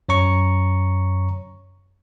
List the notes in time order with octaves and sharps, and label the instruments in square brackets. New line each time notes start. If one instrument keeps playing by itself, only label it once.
[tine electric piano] F#2 C#5 A#5 C#6